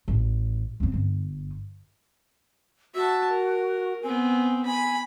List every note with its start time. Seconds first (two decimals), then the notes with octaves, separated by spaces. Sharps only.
0.08 A1
0.80 F#2 C4
0.93 G1
2.95 F#4 E5 A5
3.30 A#4
4.03 B3 C4 G#5
4.66 G#5 B5